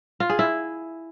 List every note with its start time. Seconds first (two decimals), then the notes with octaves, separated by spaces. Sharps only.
0.20 F4
0.30 G#4
0.39 E4